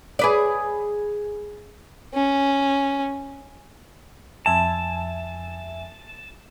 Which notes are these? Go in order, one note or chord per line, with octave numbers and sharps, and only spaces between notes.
G#4 B4 D5
C#4
F2 E5 G#5 A5